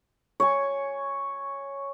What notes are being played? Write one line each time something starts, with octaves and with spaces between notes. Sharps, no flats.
C#5 G#5